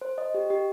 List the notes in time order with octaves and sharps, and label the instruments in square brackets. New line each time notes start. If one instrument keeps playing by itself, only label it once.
[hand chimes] C5
D#5
G4
G4